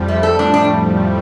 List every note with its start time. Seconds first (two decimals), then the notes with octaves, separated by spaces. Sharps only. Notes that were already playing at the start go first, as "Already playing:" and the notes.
Already playing: F2 F3 G3
0.08 A3
0.23 A4
0.39 A2 A3 D4
0.54 D4